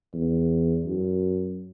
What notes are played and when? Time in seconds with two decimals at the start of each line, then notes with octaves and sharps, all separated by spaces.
0.13 E2
0.86 F#2